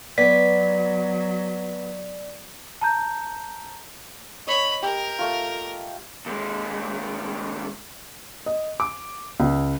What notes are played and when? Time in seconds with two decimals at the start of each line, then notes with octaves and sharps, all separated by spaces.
0.18 F#3 B3 D5 B6
2.81 A5 A#5 G6
4.47 C#5 D#5 B5
4.83 G4 A#4
5.19 A3 F4
6.26 D#2 G#3
8.46 D#5
8.80 D6
9.40 C#2